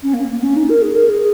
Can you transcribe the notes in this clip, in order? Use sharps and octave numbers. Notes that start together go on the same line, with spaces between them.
C#4
A#3
A#3
C#4
D#4
A#4
G#4
A#4
G#4